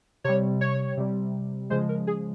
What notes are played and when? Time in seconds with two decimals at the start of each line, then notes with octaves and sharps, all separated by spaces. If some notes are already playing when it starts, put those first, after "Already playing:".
0.24 C3 G3 C#5
0.61 C#5
0.97 C3 G3
1.70 C#3 F3 G#3 C5
1.89 A#4
2.07 G#4